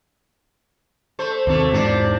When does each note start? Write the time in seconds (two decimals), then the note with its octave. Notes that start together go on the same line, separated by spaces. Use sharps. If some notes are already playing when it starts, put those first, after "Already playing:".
1.19 A3 C5
1.47 D#2 C3 A3 A#3 C4
1.71 E2 G#2 C3 E3 D4